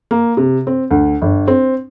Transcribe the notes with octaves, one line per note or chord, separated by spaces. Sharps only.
A#3
C3
C4
D2
G1
C4